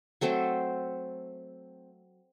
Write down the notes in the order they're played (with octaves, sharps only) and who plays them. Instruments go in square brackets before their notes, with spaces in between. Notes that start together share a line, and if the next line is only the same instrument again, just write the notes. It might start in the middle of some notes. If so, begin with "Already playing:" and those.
[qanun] F#3 A3 C4 C5